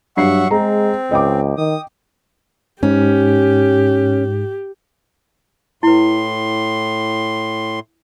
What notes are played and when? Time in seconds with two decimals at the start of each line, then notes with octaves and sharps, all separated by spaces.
0.17 G2 F#3 E5 F#5 C#6 C7
0.51 G#3 C4 G#4 A#5
1.11 C#2 D#5 G5 D6
1.57 D#3 D#6
2.83 G#2 C#4 G4
5.83 A2 E4 B4 C6